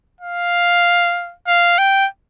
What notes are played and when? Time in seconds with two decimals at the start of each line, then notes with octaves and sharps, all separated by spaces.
0.21 F5
1.48 F5
1.78 G5